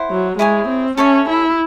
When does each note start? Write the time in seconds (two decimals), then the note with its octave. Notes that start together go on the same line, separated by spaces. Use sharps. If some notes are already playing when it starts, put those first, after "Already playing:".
Already playing: E4 C5 F#5
0.10 F#3
0.38 G#3 E4 G#4 C#5 G#5
0.68 C4
0.97 C#4 A4 C#5 E5 G#5
1.27 E4